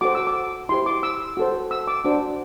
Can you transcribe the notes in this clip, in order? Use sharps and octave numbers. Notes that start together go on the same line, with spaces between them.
F#4 A4 C5 D6
E6
D6
E4 G4 C5 C6
D6
E6
F#4 A4 C5
E6
D6
D4 F#4 C5